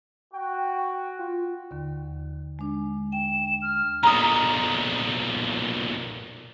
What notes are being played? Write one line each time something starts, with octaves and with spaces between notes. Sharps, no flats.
F#4 G5
F4
D#2 D3
G#3 D4
G5 E7
F6
B1 A#2 A#5 D#6